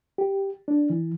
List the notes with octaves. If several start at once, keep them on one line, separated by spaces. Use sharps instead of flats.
G4
D4
E3